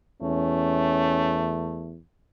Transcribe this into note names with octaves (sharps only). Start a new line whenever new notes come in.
E2 A3 C#4